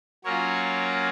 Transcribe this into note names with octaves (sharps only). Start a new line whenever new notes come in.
F#3 A#3 C#4 F4 A#4 C#5